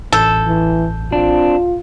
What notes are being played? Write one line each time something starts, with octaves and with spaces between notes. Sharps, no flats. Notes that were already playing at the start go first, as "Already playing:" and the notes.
A1 A4 G6
E3
C4 D4 F4